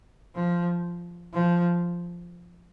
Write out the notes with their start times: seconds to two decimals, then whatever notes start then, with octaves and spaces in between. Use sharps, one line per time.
0.35 F3
1.33 F3